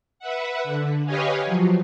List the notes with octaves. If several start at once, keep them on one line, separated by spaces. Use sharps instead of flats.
B4 E5 F#5
D3
G4 B4 C#5 D#5 F5 G#5
F3 F#3